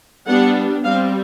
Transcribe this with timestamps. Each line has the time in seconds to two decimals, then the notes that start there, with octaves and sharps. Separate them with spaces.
0.26 G3 B3 D4 F#5
0.84 G3 C4 F5